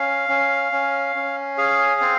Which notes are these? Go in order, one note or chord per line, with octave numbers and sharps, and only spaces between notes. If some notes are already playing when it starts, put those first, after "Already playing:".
Already playing: C#4 F5
C#4
C#4
C#4
G#4 F5
C4